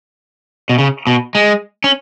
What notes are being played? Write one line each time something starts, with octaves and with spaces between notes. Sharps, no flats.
B2
C#3
B2
G#3
C#4